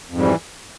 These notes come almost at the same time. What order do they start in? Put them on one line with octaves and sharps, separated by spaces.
F2 G#2 G3 E3